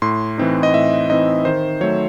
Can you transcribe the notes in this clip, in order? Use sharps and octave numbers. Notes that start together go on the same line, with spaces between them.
A2 C6
E3 C4 D#4
D#5
A2 E5
E3 C4 D#4 D#5
D#3 C5
F#3 A3 C#5